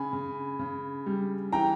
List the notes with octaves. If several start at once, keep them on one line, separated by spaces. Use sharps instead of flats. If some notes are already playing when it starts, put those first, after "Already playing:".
Already playing: C#3 G#5 B5
C#3
C#3
G3
E3 G5 A#5